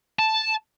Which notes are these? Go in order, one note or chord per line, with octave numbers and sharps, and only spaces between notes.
A5